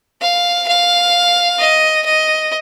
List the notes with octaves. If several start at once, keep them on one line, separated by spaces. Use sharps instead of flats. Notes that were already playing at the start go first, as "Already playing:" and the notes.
F5
F5
D#5
D#5